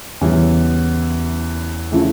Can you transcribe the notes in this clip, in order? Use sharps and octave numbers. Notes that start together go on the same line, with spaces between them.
E2 C#3 G3 C#4 E4
C#3 F3 A3 E4